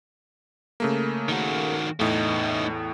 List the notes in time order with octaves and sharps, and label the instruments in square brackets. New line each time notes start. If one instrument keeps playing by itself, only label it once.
[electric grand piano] C#3 A3 A#3
[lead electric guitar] D#3 F#4
[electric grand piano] E2 A2 [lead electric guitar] A3 D#4